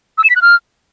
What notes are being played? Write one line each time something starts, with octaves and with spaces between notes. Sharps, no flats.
E6
E7
B6
F#6
F6